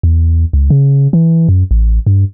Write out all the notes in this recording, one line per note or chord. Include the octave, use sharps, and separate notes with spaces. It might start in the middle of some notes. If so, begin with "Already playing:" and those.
E2
C#2
C#3
E3
F#2
A1
G2